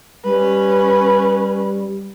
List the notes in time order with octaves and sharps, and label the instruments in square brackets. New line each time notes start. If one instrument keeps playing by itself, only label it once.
[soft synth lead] G3 [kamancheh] C#4 B4